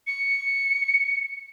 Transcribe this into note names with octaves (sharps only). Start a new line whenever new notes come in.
C#7